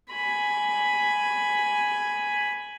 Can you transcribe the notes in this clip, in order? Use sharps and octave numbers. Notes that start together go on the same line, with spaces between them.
G#5 B5